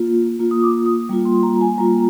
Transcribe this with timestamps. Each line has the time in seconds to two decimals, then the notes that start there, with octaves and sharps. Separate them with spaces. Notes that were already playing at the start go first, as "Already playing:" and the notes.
Already playing: A#3 F4
0.40 A#3 F4
0.51 D#6
0.63 D6
0.86 D#6
1.09 G3 A#3 F4
1.25 C6
1.43 A#5
1.61 G#5
1.78 G3 A#3 F4 A#5